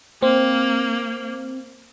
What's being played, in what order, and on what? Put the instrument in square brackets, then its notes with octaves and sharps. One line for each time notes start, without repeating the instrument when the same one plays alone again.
[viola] A#3 [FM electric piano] C4